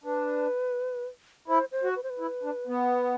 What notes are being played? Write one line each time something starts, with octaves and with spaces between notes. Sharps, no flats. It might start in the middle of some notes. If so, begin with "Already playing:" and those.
D4 B4
E4 C5
C5
F#4
B4
C5
B4
E4
D4
B3